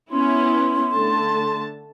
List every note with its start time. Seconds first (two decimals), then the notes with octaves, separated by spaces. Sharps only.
0.11 B3 C#4 E4 C6
0.94 D3 A3 A5